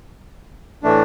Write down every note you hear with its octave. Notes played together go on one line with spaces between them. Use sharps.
A2 E3 A3 D4